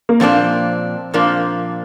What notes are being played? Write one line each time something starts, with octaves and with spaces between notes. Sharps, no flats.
A#3
A#2 F3 A#3 C4 D4
A#2 F3 A#3 D4